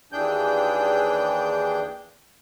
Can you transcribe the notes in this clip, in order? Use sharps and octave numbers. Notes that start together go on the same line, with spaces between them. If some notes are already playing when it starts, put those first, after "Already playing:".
D#2 E3 D4 G#4 G5 G6